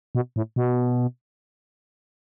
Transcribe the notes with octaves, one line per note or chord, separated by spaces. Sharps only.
B2
A2
B2